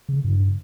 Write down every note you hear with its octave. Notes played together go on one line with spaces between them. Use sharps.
C#3
G2